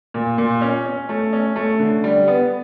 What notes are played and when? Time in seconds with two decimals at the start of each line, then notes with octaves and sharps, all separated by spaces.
0.14 A#2
0.38 A#2
0.61 C#4
0.85 C#4
1.09 A3
1.33 C#4
1.56 A3
1.79 D3
2.04 G3
2.28 B3